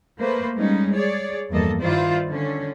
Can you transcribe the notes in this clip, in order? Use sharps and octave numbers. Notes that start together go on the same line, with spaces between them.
A3 A#3 B4 C5
G3 G#3 A#3 C#4 D#4
G#4 C#5 D5
E2 G2 F3 A#3 A4 D#5
G2 D#3 E4 F4 C5 D5
D3 C#4